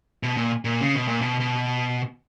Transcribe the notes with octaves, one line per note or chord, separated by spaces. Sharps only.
B2
A#2
A#2
C#3
B2
A#2
B2
B2